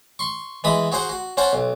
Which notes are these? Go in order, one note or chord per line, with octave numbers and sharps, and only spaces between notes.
C6 C#6
E3 G#3 B5 D#6
F#4 G#4 C5 F#5
F#4
C#4 C5 F#5 A5
B1